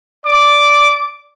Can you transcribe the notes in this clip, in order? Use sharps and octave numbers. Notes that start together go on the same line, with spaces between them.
D5 D6